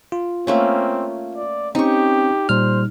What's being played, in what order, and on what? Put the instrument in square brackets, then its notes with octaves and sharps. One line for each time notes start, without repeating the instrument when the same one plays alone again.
[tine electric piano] F4
[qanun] A3 A#3 C#4 [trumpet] C4
[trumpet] D5
[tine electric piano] C4 C#4 [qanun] D#4 C#6 [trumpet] G4
[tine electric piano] A#2 G3 F6 [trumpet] C5